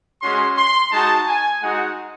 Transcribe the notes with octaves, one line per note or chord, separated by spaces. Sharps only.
G#3 C#4 F#4 C6
C6
G#3 D#4 F#4 A5
G#5
G#3 D#4 F#4 F#5